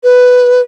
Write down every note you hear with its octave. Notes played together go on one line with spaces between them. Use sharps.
B4